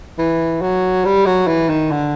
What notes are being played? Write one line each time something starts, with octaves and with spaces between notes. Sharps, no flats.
E3
F#3
G3
F#3
E3
D#3
D3